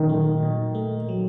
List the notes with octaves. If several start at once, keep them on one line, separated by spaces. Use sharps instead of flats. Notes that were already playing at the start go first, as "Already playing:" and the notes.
Already playing: A#2 D#3 F#3
A3
A#2
A3
F#3